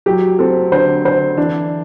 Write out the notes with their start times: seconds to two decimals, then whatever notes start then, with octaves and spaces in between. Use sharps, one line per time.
0.06 F#3 G4
0.39 C4 A4
0.72 D3 C5
1.05 D3 C5
1.37 E3 D4